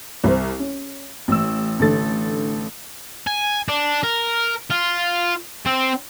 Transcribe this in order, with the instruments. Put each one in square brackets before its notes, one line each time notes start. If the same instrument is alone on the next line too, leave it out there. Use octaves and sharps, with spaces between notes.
[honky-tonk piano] C2 C5
C#4
A1 E6
A1 D3 A4 A6
[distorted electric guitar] G#5
D4
A#4
F4
C4